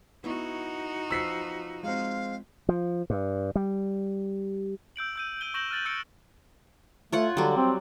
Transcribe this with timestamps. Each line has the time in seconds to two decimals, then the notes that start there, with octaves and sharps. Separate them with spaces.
0.24 B3 D#4 E4 F#4 C#6
1.11 F3 F4 B4 E6 B6 C7
1.83 G#3 C4 F5
2.69 F3
3.10 G2
3.55 G3
4.96 E6 G6 D7 F#7
5.16 E6 G6 D#7
5.41 G6 D#7 G7
5.54 C#6 G6 A#6 E7 F#7 G7
5.71 F6 F#6 A6 F#7
5.85 E6 G6 A6 C#7 D7 G7
7.12 A3 F4 C#5 F#5
7.37 D3 F#3 G3
7.57 C4